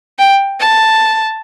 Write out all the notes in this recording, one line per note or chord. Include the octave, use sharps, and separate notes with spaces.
G5
A5